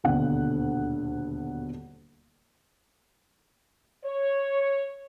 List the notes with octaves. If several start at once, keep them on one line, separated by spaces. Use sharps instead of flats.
D#1 D2 B2 D3 F#5
C#5